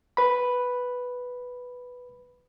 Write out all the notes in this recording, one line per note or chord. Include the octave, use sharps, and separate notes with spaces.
B4 B5